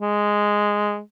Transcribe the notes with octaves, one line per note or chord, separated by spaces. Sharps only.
G#3